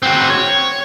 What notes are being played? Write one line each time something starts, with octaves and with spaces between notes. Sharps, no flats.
C4 F#4
C#5